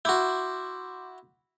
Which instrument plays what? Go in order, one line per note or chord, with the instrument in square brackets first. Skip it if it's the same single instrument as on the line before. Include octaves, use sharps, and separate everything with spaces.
[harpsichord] E4 F#4 [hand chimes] C6 D6 G6